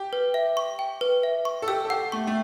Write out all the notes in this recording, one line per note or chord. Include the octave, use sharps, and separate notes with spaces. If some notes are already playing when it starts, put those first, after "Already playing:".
Already playing: G4
B4
E5
C#6
G5
B4
E5
C#6
A4
G4 E6
A4
G4 F#5
A3 C#6
A3